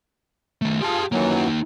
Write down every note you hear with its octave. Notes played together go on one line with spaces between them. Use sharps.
D#3 A3
F4 G4 G#4 A5
F#2 E3 F#3 A#3 D#4